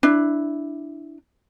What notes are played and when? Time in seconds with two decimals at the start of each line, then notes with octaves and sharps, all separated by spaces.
0.03 D4 E4